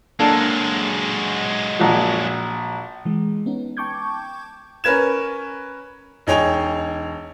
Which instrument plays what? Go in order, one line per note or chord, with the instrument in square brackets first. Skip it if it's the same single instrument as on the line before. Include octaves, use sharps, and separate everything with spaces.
[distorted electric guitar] F#3 G#3 [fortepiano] A#3 D4 A4
[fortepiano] A#1 F#4
[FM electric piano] E3 G#3
B3 C#4 D#4
G5 A5 C#6 D6 G6 G#6
[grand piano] C#4 A#4 B4 G#6 E7
E1 D#4 G#4 C#5 G5 F7